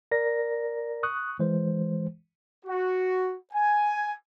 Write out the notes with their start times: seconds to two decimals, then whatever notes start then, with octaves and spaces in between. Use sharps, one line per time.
0.11 A#4 D5 A#6
1.03 C#6 D#6 F#6
1.39 E3 G#3 C5
2.65 F#4
3.53 G#5